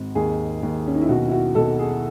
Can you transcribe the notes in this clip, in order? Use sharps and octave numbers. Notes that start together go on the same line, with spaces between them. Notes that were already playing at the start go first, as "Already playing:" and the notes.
Already playing: G#1
D#2 G#4
D#2
C#4
D#4
E4
B1 F#4
E4
F#4
B1 A4
G#4